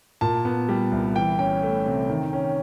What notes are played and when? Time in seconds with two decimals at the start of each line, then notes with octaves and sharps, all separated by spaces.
0.21 A#2 A5
0.45 B3
0.69 G3
0.92 C2
1.16 E3 G5
1.39 C#4 G5
1.63 A3
1.86 C3
2.10 D#3
2.33 C#4